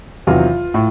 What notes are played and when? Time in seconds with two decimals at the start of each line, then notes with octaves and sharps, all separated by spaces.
0.27 E2 C3 D#3 F#3 F4
0.74 A2